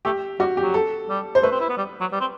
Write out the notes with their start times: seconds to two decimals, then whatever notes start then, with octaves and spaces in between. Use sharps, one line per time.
0.05 A3 G4
0.40 G3 F#4
0.57 G4
0.62 F#3
0.74 A4
1.09 G3
1.35 C5
1.43 A3 B4
1.51 C4
1.61 E4
1.69 B3
1.77 G3
2.00 F#3
2.12 G3
2.20 C4